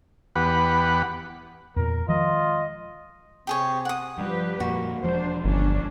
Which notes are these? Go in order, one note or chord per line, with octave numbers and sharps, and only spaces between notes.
E2 G4 B4 F#5 B5
E2 A#2 A#4
D#3 F3 G#3 F4 D#5
C3 G4 G#4 C#5
F#5 D#6
G2 F3 G3 G4 B4
F2 A#2 A#3 F#4
E1 F3 G#3 D4 C5
G1 C#4 D4